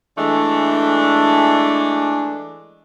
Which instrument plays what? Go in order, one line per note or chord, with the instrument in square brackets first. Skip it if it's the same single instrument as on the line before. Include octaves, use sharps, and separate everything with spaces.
[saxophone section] E3 G#3 A3 D4